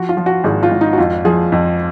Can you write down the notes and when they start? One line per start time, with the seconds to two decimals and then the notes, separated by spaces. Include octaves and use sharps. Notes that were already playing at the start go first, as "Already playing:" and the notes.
Already playing: F3 F#4
0.09 F4
0.17 F3
0.26 F#4
0.44 G#1 G#4
0.63 F4
0.71 G#1
0.81 D#4
0.93 F#4
0.98 F2 F4
1.25 F3 G#4
1.52 F2